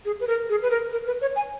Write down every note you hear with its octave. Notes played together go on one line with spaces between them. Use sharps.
G#4
B4
A#4
G#4
B4
A#4
A#4
B4
C#5
G#5